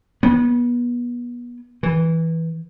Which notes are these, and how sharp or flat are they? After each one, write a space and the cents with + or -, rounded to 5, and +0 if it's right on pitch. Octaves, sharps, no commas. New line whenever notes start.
B3 -30
E3 -15